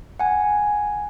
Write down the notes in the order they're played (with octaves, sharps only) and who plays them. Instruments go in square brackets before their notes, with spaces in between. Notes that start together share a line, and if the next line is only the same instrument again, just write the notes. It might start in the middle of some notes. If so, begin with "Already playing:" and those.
[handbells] F#5 G#5